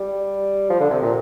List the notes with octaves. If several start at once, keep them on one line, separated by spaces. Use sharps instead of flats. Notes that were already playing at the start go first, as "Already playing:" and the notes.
Already playing: G3
F3
D3
C3
A#2